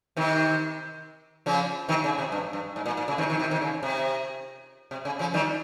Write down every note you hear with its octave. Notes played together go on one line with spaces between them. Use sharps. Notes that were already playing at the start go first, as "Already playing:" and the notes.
C3 D#3
C#3 F3
C3 D#3
C#3
C3
G2
G2
G#2
A#2
A#2
C#3
C3 D#3
C3 D#3
C3 D#3
C3 D#3
C#3
C3
C3
C#3
C#3 F3
D#3 G3